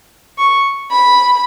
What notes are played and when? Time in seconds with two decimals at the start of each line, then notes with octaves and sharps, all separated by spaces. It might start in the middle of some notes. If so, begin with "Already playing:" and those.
0.38 C#6
0.91 B5